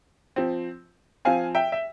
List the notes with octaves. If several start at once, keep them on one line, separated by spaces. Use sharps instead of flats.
F3 C4
F3 C4 F5 G#5
E5 G5
E5